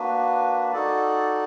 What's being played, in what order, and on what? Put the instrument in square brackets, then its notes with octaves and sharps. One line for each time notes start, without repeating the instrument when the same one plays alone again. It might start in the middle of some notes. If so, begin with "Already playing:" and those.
Already playing: [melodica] A#3 D4 F#4 B4
D#4 F#4 A4 D5